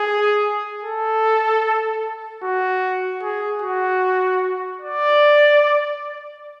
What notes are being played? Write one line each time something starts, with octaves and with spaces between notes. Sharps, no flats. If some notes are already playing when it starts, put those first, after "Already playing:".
Already playing: G#4
A4
F#4
G#4
F#4
D5